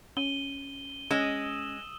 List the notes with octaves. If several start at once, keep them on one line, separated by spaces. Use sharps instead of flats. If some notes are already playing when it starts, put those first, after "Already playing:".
C#4 D#7 G7
G#3 C#4 D#6 E6 E7